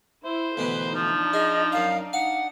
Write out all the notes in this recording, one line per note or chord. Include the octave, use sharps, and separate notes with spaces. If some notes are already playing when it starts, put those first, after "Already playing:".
E4 C5
D2 B2 E3 B4
F3 D4 D#4
G#4 D#5
F#2 F5 A#5
F5 F#5